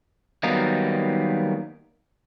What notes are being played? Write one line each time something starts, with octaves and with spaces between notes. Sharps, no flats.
D#3 F#3 G3 A#3 B3 D#4